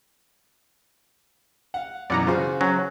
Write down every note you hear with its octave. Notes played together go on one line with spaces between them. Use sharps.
F5 F#5
F#2 B2 E3 D5 F#5 A#5
C#3 F4 F#4 C5
F#3 C#4